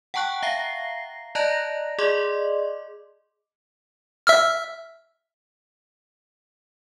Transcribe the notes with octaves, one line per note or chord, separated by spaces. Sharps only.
F#5 G5 A5 C#6 F#6
E5 F5 A#5 A#6 C7
D5 D#5 A5 A#5 F#6 A#6
G#4 D5 D#5 C6 D6
E5 E6 F6